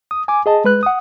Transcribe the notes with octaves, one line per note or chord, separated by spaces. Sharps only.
D#6
G#5 D6
G#4 D#5 A5
G#3 B4 F#6
F#5 D#6